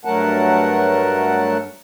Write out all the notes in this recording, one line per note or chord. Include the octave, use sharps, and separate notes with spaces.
G2 F#3 A3 A#4 F#5 A5